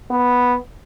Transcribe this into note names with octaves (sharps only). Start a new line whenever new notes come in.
B3